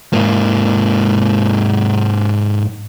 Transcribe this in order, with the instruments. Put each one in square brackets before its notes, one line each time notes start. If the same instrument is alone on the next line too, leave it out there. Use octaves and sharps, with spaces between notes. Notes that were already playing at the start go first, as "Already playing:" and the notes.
[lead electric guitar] G#2 A#3